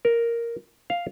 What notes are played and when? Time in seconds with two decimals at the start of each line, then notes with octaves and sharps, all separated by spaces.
0.05 A#4
0.90 F5